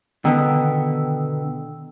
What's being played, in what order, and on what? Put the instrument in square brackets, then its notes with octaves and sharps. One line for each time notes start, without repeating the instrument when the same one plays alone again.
[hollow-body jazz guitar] B2 D3 B3 [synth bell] D#3 G5 E6